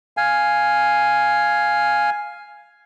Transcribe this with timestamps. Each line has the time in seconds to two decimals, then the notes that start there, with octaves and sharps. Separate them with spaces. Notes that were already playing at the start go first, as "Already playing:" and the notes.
0.17 F5 G#5